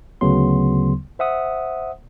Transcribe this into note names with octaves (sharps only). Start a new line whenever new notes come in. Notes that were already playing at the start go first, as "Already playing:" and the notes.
D2 C#3 F#3 B3 C6
C5 E5 F#5 D#6